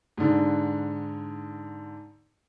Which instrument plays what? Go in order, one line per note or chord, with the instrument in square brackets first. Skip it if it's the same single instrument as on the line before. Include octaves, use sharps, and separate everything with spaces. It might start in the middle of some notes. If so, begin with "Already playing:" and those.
[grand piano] G#2 D3